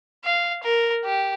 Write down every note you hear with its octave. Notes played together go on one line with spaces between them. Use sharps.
F5
A#4
G4